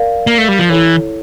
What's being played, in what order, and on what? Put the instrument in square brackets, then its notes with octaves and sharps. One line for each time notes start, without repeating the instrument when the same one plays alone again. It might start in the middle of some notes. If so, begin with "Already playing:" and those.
Already playing: [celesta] A#4 D5 F5
[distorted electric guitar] A#3
A3
G3
F3
[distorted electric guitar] E3 [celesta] E4 A4 C#5